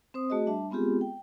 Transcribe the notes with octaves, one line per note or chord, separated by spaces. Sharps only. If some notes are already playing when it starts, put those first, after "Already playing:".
C4 C5 D#6
A3 F#4 G#4 D#5
G3 D4 E5 A5
G#3 B3 C4 F4 G4 G#4
G5